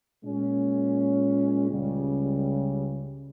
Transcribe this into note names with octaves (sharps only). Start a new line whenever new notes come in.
A#2 G#3 C#4
C#2 C#3 G3